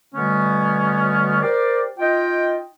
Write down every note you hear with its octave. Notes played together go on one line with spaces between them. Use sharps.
B2 D3 G3 A3 B3 C#4
G4 A#4 C5 D5
D#4 F4 D#5 G5